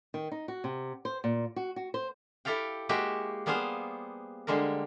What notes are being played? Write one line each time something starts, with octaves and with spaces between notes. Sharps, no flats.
D#3
D#4
F#4
C3
C5
A#2
F#4
F#4
C5
E4 G4 A4 F5 G5
G#3 A#3 F#4 G4 E5
G3 A#3 B3 G#4 C5 F5
D3 G3 G#3 A#3 A#4